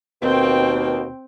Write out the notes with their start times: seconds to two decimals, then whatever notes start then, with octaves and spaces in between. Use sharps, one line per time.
0.22 D#2 B2 C4 G5